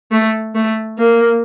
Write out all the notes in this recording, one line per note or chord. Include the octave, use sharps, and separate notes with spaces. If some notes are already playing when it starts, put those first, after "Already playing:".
A3
A3
A#3